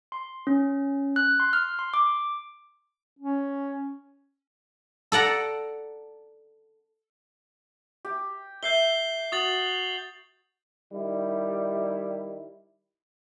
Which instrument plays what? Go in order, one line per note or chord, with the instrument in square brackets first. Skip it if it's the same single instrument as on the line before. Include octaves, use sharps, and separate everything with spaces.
[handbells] C6
C#4
F#6
C6
F6
C6
D6
[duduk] C#4
[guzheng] A4 D5 F#5 A#5
[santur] G4
[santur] E5 [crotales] G6 C7 G7
[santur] F#4 [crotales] D#6 A6 F#7
[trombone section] D#3 G3 E4